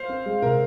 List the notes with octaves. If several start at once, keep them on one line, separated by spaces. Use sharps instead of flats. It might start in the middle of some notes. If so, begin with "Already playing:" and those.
Already playing: C5 F5
C4
G#3
C3 A#4